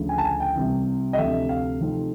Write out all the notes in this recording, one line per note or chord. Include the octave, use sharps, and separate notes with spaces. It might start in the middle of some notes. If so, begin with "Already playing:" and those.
Already playing: D2 C#3 F3
G#5
A5
G#5
G5
C2 C3 E3
D#5
D2 C3 F3 A3 E5
F5
C3 F3 A3 C4 D#4